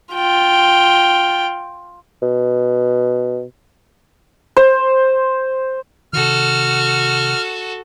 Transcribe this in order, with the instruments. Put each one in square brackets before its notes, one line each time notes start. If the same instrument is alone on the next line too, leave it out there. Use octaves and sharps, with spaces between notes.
[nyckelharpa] F4 G5
[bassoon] B2
[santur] C5
[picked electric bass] C3 D#3 [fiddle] F#4 A4 [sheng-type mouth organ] F6